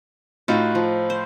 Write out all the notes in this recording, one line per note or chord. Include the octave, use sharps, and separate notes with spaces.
A2 D#4 F4 F#4
F3
C5